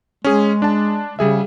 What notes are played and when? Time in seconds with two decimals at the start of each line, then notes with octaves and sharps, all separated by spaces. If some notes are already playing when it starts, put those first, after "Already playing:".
0.24 G#3 C#4 G#4
0.62 D4 A5
1.19 C#3 G3 G#4 E5